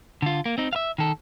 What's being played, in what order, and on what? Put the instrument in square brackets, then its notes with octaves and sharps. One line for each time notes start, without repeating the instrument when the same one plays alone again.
[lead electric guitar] D3 F4
A#3
C4 D#4
E5 F5
D#3 A4